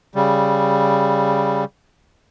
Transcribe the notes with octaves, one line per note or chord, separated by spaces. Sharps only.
C#3 G3